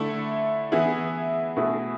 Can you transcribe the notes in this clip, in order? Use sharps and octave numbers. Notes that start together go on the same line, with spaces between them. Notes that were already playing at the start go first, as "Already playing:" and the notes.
Already playing: D3 A3 E4 A4
E3 B3 E4 G#4
B2 A3 E4 G#4